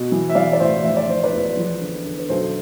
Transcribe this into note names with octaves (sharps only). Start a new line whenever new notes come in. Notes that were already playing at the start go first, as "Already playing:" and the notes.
Already playing: B2
E3
E5
E3 D5 F5
D5
A1 C5 E5
F1 E5
D5
F1 C5
B4 D5
E2
F3
D3
D3
B4
B1 A4 C5